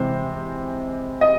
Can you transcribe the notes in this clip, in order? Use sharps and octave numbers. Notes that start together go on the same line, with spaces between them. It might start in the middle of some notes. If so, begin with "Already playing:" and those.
Already playing: C3 E3 G#3 C5
D#5